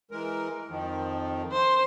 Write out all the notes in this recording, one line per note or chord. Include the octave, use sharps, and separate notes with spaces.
E3 G#3 A#4
F2 D#3 F3
C5